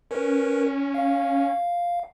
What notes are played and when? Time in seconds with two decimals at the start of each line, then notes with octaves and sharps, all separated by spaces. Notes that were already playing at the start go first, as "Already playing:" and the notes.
0.11 C#4 A#4 B4
0.94 F5